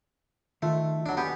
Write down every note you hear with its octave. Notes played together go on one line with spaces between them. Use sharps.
D#3 A3 F4
F#3 D4
B3 C#4 G4 G#5 C6